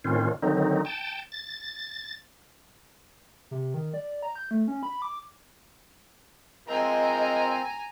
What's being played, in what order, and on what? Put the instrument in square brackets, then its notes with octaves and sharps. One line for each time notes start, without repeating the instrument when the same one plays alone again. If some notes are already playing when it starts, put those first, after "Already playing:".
[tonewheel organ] A2 D#3 C4 C#4 F4
D3 D#3 F#3 C4 D#4
G5 A5
A6
[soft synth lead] C3
D#3
D5
A#5
G6
A3
C#4
B5
D6
[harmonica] F3 G#3 A#4 [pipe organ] C4 [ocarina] D#5 [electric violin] G#5 A#5